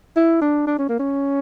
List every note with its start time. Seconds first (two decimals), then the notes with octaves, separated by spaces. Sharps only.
0.16 E4
0.41 D4
0.67 D4
0.78 C#4
0.89 A#3
0.99 C#4